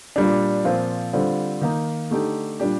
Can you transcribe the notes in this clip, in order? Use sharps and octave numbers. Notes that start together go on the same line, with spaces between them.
A#2 G3 D4
A#2 F3 C4 F4
D3 G3 C4 F4
D#3 A#3 D#4
D3 A3 D#4 G4
A#2 G3 D4 G4